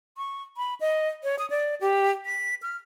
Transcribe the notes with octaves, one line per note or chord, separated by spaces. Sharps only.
C#6
B5
D#5
C#5
D#6
D5
G4
B6
F6